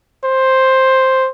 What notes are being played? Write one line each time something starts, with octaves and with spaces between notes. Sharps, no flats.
C5